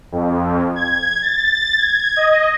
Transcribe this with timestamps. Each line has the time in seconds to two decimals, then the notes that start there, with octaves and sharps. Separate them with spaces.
0.12 F2
0.76 G#6
1.22 A6
1.78 G#6
2.16 D#5